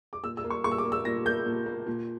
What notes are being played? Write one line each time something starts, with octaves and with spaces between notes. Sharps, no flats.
D6
A#2 E6
E6
A#3
C#6
A#2 C#6
E6
D6
A#3
E6
A#2 A#6
A#3 G6
A#2
A#3
A#2